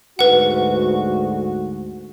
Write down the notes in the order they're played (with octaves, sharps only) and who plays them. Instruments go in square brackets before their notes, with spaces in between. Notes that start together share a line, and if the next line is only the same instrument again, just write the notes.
[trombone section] D2 G#2 F#4 [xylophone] B4 F#5